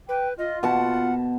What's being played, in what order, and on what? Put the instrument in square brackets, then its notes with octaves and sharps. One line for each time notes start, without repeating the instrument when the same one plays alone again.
[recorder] B4 [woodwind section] G5
[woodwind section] F4 [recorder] D#5
[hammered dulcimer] B2 A5 [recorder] F#5